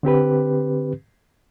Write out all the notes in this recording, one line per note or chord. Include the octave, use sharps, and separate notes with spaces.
D3 C4 G4 B4